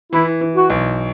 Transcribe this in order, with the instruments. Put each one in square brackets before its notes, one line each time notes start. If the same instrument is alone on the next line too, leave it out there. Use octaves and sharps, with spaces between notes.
[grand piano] E3 [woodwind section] E4
[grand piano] E3
[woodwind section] F#4
[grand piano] B1